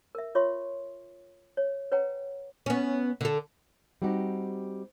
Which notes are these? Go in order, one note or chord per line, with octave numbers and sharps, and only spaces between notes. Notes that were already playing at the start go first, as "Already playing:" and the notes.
A#4 E5
F4 C#5 E5 C6 C#6
C#5
B4 C#5 F#5 G5 A#5
B3 C#4
D3 A4
G3 C4 D#4 F#4 G4